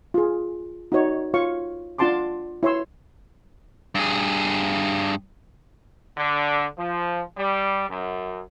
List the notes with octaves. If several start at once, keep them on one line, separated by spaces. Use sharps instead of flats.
F4 G#4
D#4 F#4 C#5 D5
F4 C#5 F5 C#6
D4 F4 F#5 A5 C6 D6
E4 C#5 C6 E6
G2 G#4
D3
F3
G3
F#2